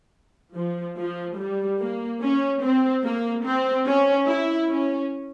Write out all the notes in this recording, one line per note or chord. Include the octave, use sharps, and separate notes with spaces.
F3
F3
G3
A#3
C#4
C4
A#3
C4
C#4
E4
C#4